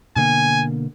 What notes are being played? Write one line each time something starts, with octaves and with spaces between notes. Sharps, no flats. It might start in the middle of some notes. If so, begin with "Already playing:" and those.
B2 D3 A#3 G#5